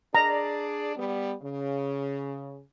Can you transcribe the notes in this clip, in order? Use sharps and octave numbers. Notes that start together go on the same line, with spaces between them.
D4 G#4 D5 A#5
G3 B3
C#3